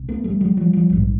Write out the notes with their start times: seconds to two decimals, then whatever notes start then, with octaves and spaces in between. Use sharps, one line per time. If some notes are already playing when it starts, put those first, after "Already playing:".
Already playing: C2 C3
0.09 A3 B3
0.24 G3 A3
0.41 F#3 G#3
0.57 F3 G3
0.73 F3 G3
0.90 A#1 G#2